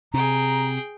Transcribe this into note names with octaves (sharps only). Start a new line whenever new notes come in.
C3 G#4 G5 A#5